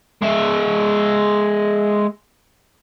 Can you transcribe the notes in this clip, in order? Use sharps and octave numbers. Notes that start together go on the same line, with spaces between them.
G#3 E5